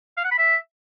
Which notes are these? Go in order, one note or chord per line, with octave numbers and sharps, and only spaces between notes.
F5
F#5
B5
E5